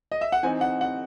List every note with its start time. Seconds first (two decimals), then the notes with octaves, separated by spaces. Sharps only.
0.12 D#5
0.21 E5
0.32 F#5
0.43 E3 C4 D#4 G#5
0.61 F#5
0.81 F#5